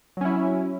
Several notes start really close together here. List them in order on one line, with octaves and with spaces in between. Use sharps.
F#3 C#4 E4